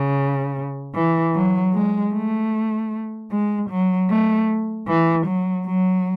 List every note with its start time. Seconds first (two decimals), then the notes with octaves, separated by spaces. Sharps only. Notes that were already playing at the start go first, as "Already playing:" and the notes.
Already playing: C#3
0.95 E3
1.35 F#3
1.74 G#3
2.13 A3
3.31 G#3
3.71 F#3
4.10 A3
4.88 E3
5.27 F#3
5.66 F#3